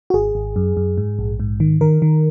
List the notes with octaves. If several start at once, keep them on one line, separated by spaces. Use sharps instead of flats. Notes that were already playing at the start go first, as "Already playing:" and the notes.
F#4
G#1 G#4
G#1
F#2
F#2
G#2
A#1
G#2
D#3
D#3 A#4
D#3